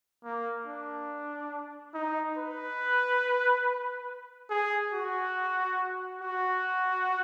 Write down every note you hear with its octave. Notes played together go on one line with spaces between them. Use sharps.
A#3
D4
D#4
B4
G#4
F#4
F#4